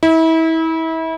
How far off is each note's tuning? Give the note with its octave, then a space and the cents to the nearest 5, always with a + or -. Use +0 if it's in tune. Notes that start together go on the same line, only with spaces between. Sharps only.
E4 -30